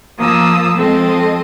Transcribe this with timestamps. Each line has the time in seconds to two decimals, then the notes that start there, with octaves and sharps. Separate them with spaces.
0.18 F3 A#3 A5 D#6 E6
0.76 F3 G#3 C4 A4 D#5